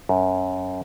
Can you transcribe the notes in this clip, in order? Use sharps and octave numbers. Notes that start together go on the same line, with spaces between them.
F#2